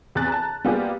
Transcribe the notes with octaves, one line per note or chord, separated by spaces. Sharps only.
E2 C3 F#6 A6
A5 A#5
G3 A#3 B3 F4 G4 G#4